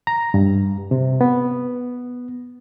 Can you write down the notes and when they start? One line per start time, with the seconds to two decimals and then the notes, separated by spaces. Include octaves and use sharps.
0.07 A#5
0.34 G2
0.91 C3
1.21 B3